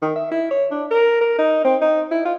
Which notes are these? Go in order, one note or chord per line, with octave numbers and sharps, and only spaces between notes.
D#3
E5
E4
C#5
D4
A#4
A#4
D#4
C4
D#4
E4
F4